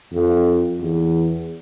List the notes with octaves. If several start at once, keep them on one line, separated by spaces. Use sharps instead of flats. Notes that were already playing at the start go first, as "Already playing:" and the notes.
F2
E2